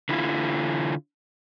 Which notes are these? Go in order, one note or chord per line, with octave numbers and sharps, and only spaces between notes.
D3 E4 F4